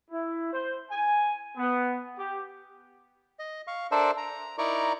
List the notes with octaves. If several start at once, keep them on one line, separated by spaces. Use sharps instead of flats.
E4
C5
G#5
B3
G4
D#5
F5 C#6
D4 A4 A#4 C5 D5 E5
A#5
D#4 E4 A#4 D5 A#5 C#6